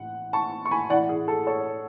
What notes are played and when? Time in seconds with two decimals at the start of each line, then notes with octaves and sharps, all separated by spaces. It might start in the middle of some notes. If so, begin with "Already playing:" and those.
Already playing: A1 F#5
0.33 A5 C#6
0.65 C#6
0.71 G#5 B5
0.90 A1 A2 E3 D5 F#5
1.09 G#4
1.28 A4
1.47 A4 C#5